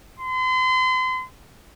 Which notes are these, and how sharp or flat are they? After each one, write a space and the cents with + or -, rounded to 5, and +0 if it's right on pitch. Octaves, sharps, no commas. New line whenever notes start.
C6 -40